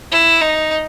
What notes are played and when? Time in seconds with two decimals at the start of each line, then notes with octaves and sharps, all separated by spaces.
0.12 E4
0.41 D#4